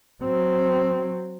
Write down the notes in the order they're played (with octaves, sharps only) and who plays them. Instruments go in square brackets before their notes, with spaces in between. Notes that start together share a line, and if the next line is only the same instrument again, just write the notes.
[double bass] F#3 C4